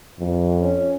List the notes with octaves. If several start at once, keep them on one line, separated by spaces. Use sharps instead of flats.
F2
C#4